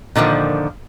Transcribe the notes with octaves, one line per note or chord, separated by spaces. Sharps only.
A#2 D3 D#3 F3